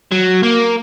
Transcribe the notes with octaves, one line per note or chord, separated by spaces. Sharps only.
F#3
A#3